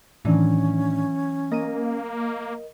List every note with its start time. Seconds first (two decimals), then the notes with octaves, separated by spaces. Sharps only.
0.25 A2 D#3 E3 F#3 C#4 D4
1.52 A#3 A#4 D#5 A#6 D#7